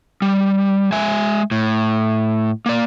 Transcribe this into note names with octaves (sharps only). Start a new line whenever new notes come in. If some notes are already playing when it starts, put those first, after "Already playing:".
G3
G#3 E5 G#5
A2
A#3 D5